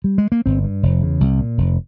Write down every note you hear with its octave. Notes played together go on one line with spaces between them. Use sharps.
G3
G#3
A#3
G1 C4
G2
F1
E2 C#3
C2
A#2
F1